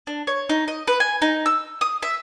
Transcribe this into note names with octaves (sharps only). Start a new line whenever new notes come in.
D4
C#5
D#4
D#5
B4
G#5
D#4
E6
D#6
E5